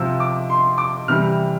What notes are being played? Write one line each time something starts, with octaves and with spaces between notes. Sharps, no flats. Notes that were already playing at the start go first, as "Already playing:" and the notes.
Already playing: C3 F3 E6
D6
C6
D6
C3 E3 G3 F6